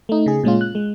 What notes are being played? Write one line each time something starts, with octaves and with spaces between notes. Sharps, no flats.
A3 D#4
C#3 G#4
A#2 G#3 C#4 F4
F#6
G#3